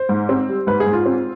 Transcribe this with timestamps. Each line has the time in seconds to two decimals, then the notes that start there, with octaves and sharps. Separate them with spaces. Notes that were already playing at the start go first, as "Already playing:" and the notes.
Already playing: C5
0.09 G#2
0.29 C4
0.49 G3
0.67 G#2 B4
0.80 G#4
0.86 G#2
0.93 F4
1.06 C4